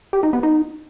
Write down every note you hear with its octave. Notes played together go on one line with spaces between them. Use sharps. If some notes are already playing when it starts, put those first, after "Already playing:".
G4
D#4
B3
D#4